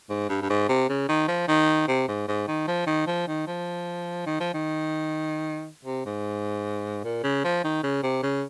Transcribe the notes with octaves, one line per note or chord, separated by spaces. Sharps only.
G#2
G2
G2
G#2
C3
C#3
D#3
F3
D#3
C3
G#2
G#2
D#3
F3
D#3
F3
D#3
F3
D#3
F3
D#3
C3
G#2
A#2
C#3
F3
D#3
C#3
C3
C#3